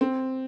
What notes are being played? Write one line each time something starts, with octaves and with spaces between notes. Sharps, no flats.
C4